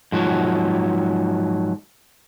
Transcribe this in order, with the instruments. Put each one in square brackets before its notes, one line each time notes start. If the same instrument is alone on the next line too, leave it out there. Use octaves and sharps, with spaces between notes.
[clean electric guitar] G#2 F3 F#3